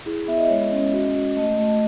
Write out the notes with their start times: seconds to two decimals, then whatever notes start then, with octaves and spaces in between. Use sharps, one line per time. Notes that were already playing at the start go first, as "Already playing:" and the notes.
0.06 E4 G#4
0.28 B3 E5
0.38 D#5
0.48 G#3 C#5
0.58 D#5
0.71 C#4
0.93 F#4
1.15 F#4
1.37 A3 D#5
1.59 A3